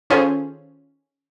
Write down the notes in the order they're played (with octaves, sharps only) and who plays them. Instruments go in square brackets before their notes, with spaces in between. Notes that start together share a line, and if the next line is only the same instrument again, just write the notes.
[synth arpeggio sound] D#3 C#4 F4 G#4 A4 C5